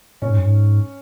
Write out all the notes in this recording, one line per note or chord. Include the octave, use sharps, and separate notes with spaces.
A#2 C#4
G#2
F#2
G#2